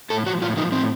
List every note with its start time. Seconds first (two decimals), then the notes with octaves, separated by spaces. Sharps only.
0.10 A2 A4
0.26 F3 F#4
0.42 A2 F4
0.57 F3 D#4
0.72 A2 C4